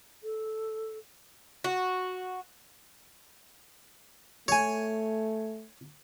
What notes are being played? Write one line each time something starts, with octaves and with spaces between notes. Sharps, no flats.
A4
F#4
A3 C#5 G#5